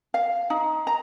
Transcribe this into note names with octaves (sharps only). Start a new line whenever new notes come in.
F5
D#4
A#5